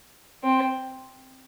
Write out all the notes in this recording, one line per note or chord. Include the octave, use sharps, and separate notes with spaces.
C4